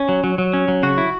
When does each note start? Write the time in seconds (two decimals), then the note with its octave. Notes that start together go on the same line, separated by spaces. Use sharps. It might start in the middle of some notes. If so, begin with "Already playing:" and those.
Already playing: C#4
0.09 F#3
0.24 F#3
0.38 F#3
0.53 C#4
0.68 F#3
0.83 C#3 F#4
0.98 E4